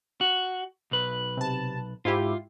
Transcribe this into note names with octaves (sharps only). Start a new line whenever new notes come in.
F#4
B1 B4
C3 A5
G#2 E4 F4 G4